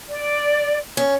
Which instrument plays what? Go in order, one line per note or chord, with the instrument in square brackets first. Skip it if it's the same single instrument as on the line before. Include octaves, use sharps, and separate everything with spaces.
[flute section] D5
[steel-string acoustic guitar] C#4